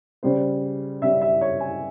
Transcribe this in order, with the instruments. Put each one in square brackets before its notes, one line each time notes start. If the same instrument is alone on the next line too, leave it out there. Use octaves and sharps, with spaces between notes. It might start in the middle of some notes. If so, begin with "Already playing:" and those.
[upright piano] C#3 G3 C#4 C5
C#3 G3 C#4 E5
E5
C#5
G#5